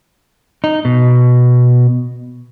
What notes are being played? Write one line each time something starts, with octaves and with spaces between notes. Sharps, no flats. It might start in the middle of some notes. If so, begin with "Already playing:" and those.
D#4
B2